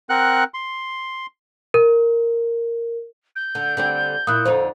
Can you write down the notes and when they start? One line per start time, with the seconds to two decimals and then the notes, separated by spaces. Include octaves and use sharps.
0.10 C4 A#4 F#5 F#6
0.54 C6
1.74 A#4
3.36 G6
3.55 D3
3.77 D3 G3 C4
4.27 A#2 E4 D#6 F#6
4.45 F2 D3 D#4 C5